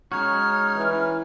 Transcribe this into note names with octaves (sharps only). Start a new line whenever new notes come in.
G#3 C#4 D#4 F#4 C#5 F6
E3